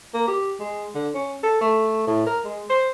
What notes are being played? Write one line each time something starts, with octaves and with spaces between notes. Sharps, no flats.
A#3
G4
G#3
D3
C#4
A4
A3
A2
A#4
G#3
C5